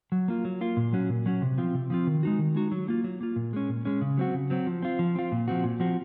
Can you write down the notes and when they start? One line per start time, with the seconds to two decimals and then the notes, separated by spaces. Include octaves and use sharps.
0.12 F#3
0.28 A#3 F4
0.45 F#3
0.61 A#3 F4
0.77 A#2
0.93 F#3 C#4 F#4
1.09 A#2
1.26 F#3 C#4 F#4
1.42 C3
1.58 F3 C4 F4
1.74 C3
1.90 F3 C4 F4
2.07 D#3
2.23 G#3 D#4 F#4
2.39 D#3
2.55 G#3 D#4 F#4
2.72 F#3
2.88 A#3 F4
3.04 F#3
3.21 A#3 F4
3.36 A#2
3.53 G#3 C#4
3.69 A#2
3.85 G#3 C#4
4.01 C#3
4.18 F#3 C4 F#4
4.34 C#3
4.50 F#3 C4 F#4
4.67 F3
4.82 C4 F4
4.99 F3
5.15 C4 F4
5.32 A#2
5.48 F3 C4 F#4
5.64 A#2
5.80 F3 C4 F#4